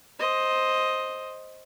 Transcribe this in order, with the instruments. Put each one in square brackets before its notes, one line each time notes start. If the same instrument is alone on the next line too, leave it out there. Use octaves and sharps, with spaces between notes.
[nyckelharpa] C5 D#5